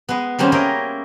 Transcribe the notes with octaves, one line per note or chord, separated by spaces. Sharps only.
G#3 B3
D#3 G3 A#3 C4 C#4
C#4 E4 G#4 A#4 D#5 G5